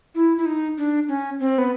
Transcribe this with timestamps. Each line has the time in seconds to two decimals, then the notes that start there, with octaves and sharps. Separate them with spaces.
0.15 E4
0.38 E4
0.46 D#4
0.78 D4
1.08 C#4
1.40 C4
1.58 B3